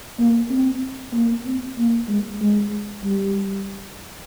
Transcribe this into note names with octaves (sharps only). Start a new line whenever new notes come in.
A#3
C4
A#3
C4
A#3
G#3
G#3
G3